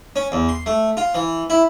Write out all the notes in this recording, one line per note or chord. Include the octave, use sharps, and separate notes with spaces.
C#4
E2
C6
A3
F4
E3
E4